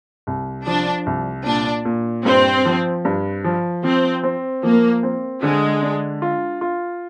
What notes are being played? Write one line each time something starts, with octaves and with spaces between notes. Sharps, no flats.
C2
F3 D4
C2
A#2 D4
A#2
G2 C4
F3
G2
F3
F3 C4
C4
F3 A#3
C4
D3 G#3
D4
F4
F4